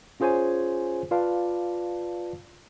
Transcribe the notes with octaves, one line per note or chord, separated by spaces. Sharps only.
C#4 F4 G#4 C5 C#5 G#5
F4 B4 D5 F5 A5